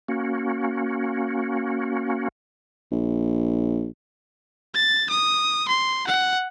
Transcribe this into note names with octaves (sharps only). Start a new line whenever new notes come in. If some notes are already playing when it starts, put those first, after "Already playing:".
A#3 C#4 F#4
A#1
A6
D#6
C6
F#5